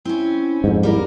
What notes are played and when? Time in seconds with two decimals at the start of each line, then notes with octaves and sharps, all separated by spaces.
0.05 C4 C#4 E4
0.64 F2 G#2 D#4
0.83 G3 A#3 E4 A#4